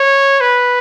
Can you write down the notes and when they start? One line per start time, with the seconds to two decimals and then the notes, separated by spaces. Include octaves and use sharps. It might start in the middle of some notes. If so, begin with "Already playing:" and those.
Already playing: C#5
0.41 B4